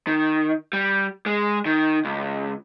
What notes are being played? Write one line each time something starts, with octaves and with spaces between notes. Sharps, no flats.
D#3
G3
G#3
D#3
C#2